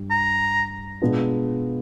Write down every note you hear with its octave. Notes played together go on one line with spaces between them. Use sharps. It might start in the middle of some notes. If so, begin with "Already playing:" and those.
Already playing: G2 G3
A#5
B2 G#3 B3 D4 F4